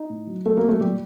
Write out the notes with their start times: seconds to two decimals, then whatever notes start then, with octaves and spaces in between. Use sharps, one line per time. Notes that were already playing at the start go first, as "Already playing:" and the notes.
Already playing: D#4
0.09 A2
0.27 F#3
0.46 F#3 A3 A4
0.57 A#3 A#4
0.63 F#3
0.68 A3 A4
0.80 A#2 G3 G4